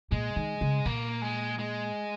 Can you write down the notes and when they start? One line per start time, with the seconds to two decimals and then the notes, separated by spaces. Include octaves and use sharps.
0.11 A#2 G#3
0.36 D#3
0.61 C#3
0.86 A#2 A#3
1.22 G#3
1.59 G#3